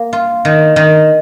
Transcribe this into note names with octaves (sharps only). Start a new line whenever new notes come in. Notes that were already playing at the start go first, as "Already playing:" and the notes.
Already playing: A#3
F4
D#3
D#3